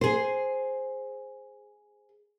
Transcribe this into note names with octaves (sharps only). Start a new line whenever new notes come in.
G#4 C5